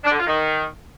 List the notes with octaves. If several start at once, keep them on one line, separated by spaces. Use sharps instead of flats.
D4
D3
F4
D#3